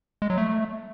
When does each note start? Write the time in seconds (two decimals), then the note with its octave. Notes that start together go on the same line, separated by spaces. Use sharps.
0.22 G#3
0.30 F#3
0.38 A3